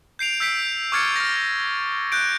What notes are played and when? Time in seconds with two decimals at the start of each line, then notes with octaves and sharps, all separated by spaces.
0.19 G6 C7 D7 F7
0.40 E6 G6 B6 C7 D7
0.92 C#6 D6 F6 G#6 A6 C#7
1.16 F6 A#6
2.12 F#6 G6 D7